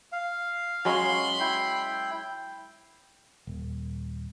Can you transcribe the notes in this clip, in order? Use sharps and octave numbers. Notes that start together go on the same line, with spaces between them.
F5
F#3 G#3 C#4 B5 C6
E4 G5
D#1